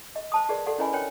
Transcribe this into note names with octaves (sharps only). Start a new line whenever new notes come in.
D#5
C5 A5 D#6
G4 G#4 A#4 B4 D5
G4 A4 D5 F#5
C#4 E4 B4 D#5 G#5 B5
D4 A#4 C5 C#5 G5